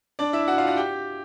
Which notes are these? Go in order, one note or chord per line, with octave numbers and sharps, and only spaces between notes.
D4 D5
E4 E5
F#4 F#5
F4 F5
F#4 F#5
G4 G5